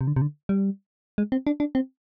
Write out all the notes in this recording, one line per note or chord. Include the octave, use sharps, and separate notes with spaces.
C3
D3
C3
D3
G3
G#3
C4
D4
D4
C4